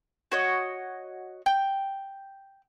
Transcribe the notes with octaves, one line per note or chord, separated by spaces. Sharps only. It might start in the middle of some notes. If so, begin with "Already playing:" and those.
F#4 C#5 D#5
G5